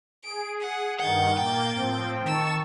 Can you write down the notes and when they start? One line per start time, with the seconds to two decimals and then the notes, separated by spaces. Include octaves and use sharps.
0.24 G#4 D7
0.60 F#5
1.00 G2 D#3 F#5 G6 A6
1.38 A#2 A#3 G5
1.75 A2 F3 C4
2.26 D#3 A5 C#6 E6